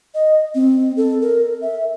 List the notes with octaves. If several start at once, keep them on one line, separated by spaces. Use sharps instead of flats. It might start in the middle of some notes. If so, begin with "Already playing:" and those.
D#5
C4
A4
A#4
E5